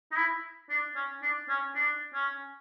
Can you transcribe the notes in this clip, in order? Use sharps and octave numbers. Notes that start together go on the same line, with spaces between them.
D#4
E4
D4
C#4
D4
C#4
D4
C#4